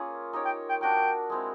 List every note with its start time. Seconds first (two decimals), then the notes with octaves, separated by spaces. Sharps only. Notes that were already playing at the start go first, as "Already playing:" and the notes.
Already playing: A#3 C#4 F4 G#4
0.33 D#4 G4 A#4 C#5
0.45 G5
0.69 G5
0.81 D4 F#4 A#4 G5
1.30 G#3 C4 E4